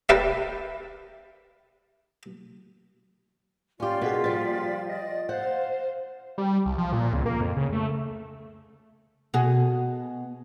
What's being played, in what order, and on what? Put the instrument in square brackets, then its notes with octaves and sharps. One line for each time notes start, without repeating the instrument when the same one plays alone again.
[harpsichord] G4 A#4 B4 D5 E5
[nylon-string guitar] C#4 G4 [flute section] F4 D5
[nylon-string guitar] B2 [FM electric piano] A#3 F#4 G#4 [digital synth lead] B6
[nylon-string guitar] F3 G3 [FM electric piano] A6
[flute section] D5 [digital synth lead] D#5
[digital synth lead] C5 [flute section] F5 [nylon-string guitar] F#5
[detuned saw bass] G3
C2
F3
A#2
C#2
A#3
F2
C#3
A3
[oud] B2 F#4 G#4